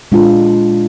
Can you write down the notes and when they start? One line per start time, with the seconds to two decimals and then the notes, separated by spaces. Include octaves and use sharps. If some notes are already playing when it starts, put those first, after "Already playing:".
0.11 A#2 G#3 D4 F4